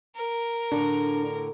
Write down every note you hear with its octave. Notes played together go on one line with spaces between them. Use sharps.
A#4
A2 D3 D4